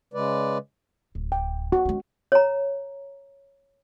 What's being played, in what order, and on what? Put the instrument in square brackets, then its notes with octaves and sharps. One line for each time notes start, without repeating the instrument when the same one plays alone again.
[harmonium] C#3 G#3 B4 D5
[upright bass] D1
[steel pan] G5
F#4
[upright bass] G#3 C#4
[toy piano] C#5 A#5